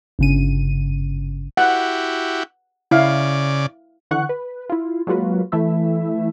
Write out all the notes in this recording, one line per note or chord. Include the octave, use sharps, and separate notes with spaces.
G1 C#3 D#7
E4 F#4 G4 F#5
C#3 E4 D5 F5
D3 E3 F#5 C#6 F#6
B4
E4 F4
F#3 G#3 A#3 F4 F#4 B4
E3 A3 E4 E5